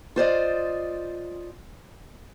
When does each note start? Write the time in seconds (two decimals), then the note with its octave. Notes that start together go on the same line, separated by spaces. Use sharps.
0.16 F4 C5 D5 D#5